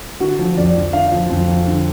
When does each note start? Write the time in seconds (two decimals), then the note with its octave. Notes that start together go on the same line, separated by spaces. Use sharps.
0.20 D3 F#4
0.39 F3
0.57 F2 D5
0.75 F2
0.93 D3 F5
1.12 F3
1.30 F2
1.48 F2
1.67 D3